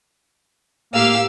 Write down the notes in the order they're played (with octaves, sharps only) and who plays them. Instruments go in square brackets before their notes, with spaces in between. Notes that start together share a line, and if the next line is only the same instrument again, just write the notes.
[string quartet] A2 G4 E6 [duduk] A#3 [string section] F5